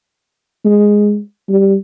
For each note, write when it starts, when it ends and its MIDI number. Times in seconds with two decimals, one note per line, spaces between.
0.65 1.20 56
1.49 1.75 55